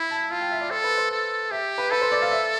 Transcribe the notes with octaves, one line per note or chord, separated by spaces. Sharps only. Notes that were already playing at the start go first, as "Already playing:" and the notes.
Already playing: E4 B5
A5
F4 F5
G5
E5
D5
A4 C5
B4
C5
A4
G4 E5
B4
A4 B4
C5
D5
F5
E5